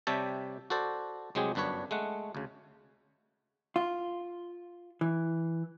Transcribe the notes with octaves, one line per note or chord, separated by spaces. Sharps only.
C3 G3 G4 C#5 E5 A5
F#4 A4 C5 D5
C2 F#3 G#3 C4 G4 G#4
G1 F#2 D4 B4 C#5
G#3 A3 F#5
D2 C#3
F4
E3